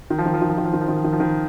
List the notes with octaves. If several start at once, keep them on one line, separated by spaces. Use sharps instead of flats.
D#3
F3
D#3
F3
D#3
F3
D#3
F3
D#3
F3
D#3
F3
D#3
F3
D#3